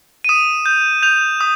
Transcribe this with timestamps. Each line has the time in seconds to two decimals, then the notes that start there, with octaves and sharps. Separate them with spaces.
0.24 D#7
0.29 D#6 E7
0.66 G6
1.02 G6 F7
1.41 D#6